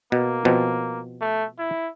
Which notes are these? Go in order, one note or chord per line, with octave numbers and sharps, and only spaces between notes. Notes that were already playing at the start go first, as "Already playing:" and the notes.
B2 A#3
B2 F3 C4
A3
E4